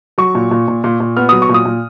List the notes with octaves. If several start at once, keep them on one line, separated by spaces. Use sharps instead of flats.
F#3 C#6
A#2
A#2
A#2
A#2
A#2
B3 F6
F#3 D#6
C#6
A#2
D#6
A#2